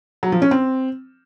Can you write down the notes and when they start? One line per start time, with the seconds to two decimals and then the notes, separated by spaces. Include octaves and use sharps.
0.23 F#3
0.32 F3
0.42 C#4
0.51 C4